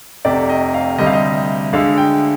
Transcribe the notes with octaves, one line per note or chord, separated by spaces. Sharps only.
F1 F2 C3 D5
D#5
F5
D2 C3 G3 D#5
F5
D#5
D2 D3 G#3 F5
G5